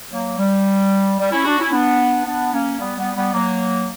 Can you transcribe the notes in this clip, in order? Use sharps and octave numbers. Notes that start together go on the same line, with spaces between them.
F#3 A#3
G3
G3
C#4 E4
D4 F#4
C#4 E4
B3 D4
B3 D4
A#3 C#4
G3 B3
G3 B3
G3 B3
F#3 A#3